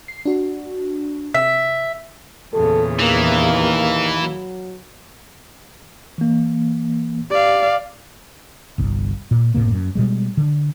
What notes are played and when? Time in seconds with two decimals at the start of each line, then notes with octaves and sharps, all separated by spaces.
0.08 C7
0.25 D4 F#4
1.34 C3 E5
2.54 E2 A#2 C#3 A4
2.99 D#2 E3 A#3
4.22 F#3
6.18 E3 A#3
7.30 G4 D5 F5
8.78 G1 C2
9.31 A#2
9.55 F#1 A2 C3 A#3
9.72 F#2
9.95 B2 G3 G#3
10.37 D3